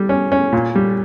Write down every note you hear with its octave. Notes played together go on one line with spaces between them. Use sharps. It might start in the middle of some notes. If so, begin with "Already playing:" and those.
Already playing: G3
C#4
C#4
A#2
G3